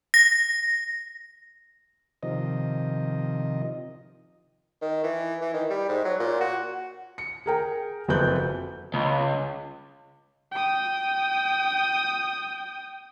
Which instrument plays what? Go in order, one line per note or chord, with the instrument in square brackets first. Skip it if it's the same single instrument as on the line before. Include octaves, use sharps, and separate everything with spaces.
[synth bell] A#6
[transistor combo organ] C3 D#3 F3 D#5
[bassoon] D#3
E3
E3
D#3
G3
G#2
F#3
A#2
F#4
[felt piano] C#7
G#4 A#4 G5
F#1 F2 F#4 B4 F#6 G6
[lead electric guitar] C#2
[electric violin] G5 D#6